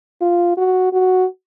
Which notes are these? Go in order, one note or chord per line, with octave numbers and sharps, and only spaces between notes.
F4
F#4
F#4